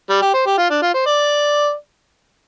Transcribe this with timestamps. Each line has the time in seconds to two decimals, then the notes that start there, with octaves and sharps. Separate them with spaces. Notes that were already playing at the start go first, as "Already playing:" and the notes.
0.10 G3
0.22 G4
0.34 C5
0.46 G4
0.58 F4
0.70 D4
0.82 F4
0.94 C5
1.06 D5